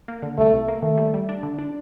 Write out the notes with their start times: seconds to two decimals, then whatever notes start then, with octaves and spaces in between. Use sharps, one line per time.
0.08 A#3
0.22 D3
0.38 C2 A3
0.54 C2
0.68 A#3
0.83 D#3 A3
0.98 G3
1.14 G3
1.29 D4
1.43 D3
1.59 D4